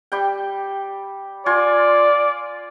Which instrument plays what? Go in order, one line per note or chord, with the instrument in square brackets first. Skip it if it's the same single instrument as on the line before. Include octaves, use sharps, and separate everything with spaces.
[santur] G3 G4 G5
[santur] F4 G#5 C6 [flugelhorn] D5